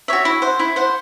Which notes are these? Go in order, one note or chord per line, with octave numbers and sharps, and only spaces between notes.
F#4 C#5 E5
E4
C5 F#5
E4
C5 F#5